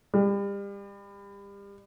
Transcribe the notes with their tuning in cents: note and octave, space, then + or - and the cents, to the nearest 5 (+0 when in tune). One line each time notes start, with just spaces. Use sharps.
G3 +35